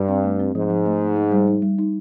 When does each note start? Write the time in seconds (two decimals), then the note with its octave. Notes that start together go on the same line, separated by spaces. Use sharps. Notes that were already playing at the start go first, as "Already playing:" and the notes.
Already playing: G2
0.09 C4
0.24 A3
0.39 C4
0.54 G#2 F3
0.70 F3
0.86 A3
1.01 A3
1.16 D#4
1.32 G3
1.48 D#4
1.62 G3
1.78 D#4